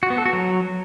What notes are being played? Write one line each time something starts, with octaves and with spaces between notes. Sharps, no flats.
F#4
B3
A4
F#4
F#3